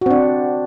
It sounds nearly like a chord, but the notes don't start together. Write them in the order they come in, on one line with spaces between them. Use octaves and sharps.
F#4 C4 D4